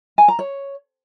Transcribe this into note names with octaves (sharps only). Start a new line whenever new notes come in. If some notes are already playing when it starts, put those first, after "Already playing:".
G#5
A#5
C#5